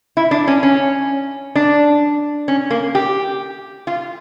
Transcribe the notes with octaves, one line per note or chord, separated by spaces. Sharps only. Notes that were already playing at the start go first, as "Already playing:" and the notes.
E4
D4
C#4
C#4
D4
C#4
A#3
G4
F4